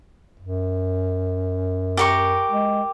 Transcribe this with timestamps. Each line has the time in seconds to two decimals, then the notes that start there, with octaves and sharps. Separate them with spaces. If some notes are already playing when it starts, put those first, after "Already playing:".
0.40 F#2
1.97 G4 A#4 C#6
2.51 G#3